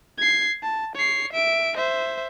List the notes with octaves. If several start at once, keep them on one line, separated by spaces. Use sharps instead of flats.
G#6 C7
A5
C#5 C7
E5 D7
C5 E5